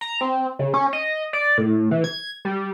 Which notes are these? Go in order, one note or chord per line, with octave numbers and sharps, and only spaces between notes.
A#5
C4
C#3
C#4
D#5
D5
A2
E3
G#6
G3